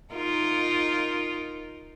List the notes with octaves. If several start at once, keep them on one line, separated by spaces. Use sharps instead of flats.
D#4 F4 A#4